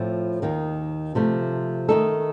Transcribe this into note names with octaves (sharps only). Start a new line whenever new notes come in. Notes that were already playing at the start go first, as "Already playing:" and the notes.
Already playing: A2 F3 A3 C4 F4
D#2 D#3 A#3
C3 F3 A3
D#3 A3 D#4 A4